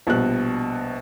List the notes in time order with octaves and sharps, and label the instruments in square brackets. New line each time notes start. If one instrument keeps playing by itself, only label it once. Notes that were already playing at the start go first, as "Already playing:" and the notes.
[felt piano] A#1 B2 G3 F#6